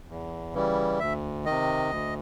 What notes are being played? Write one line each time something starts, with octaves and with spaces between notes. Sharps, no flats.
E2
C#3 E3 G3
D2 E5
C3 D#3 D#5
D2